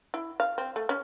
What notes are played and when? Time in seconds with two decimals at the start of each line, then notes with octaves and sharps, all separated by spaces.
0.14 E4
0.40 F5
0.58 C4
0.76 A3
0.89 C#4